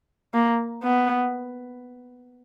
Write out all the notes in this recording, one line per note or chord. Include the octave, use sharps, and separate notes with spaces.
A#3
B3